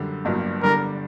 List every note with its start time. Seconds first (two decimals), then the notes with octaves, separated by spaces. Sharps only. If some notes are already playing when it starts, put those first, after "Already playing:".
Already playing: F#2 D3 G3
0.25 G1 G2 F#3 A#3
0.63 D3 G3 D4 A#4